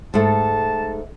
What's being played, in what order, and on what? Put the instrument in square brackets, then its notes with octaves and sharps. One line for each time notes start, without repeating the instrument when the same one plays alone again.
[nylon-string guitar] G#2 A3 [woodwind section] A5